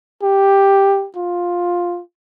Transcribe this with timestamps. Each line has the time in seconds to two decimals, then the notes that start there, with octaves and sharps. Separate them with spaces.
0.23 G4
1.16 F4